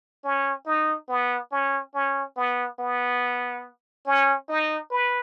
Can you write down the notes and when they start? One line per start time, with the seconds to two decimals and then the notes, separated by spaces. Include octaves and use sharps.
0.24 C#4
0.66 D#4
1.09 B3
1.52 C#4
1.94 C#4
2.37 B3
2.79 B3
4.06 C#4
4.49 D#4
4.91 B4